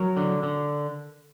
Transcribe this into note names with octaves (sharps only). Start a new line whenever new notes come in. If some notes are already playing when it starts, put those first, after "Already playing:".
Already playing: F#3 A#4
D3
D3